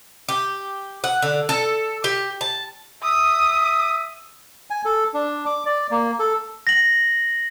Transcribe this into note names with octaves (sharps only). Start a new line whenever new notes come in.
G4
F#5
D3
A4
G4
A5
E5 D#6
G#5
A4
D4
D6
D5
A#3
A4
A#6 F#7